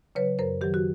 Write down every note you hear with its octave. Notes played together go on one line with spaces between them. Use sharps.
C#3 F#3 B4 C#5
F#2 A#4 C5
D#3 F#3 G4
F#4